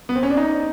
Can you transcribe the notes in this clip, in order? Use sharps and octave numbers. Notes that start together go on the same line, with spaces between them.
B3
C4
C#4
D4
D#4